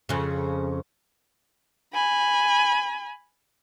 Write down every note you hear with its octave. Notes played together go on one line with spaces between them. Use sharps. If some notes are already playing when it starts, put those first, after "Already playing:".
F2 C#3
G#5 B5